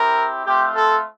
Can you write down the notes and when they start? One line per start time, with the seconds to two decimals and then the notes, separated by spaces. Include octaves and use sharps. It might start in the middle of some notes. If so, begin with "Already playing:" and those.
Already playing: C4 E4 G4 A#4
0.45 A3 C4 F4 G4
0.75 A4